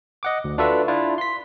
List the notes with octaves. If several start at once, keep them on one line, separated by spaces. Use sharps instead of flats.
D#5 F#5 D6
D2
D4 F4 F#4 A4 B4 E5
D4 E4 F4
C6 B6